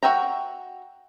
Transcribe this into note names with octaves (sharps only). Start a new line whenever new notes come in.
F#4 C5 E5 G5 A#5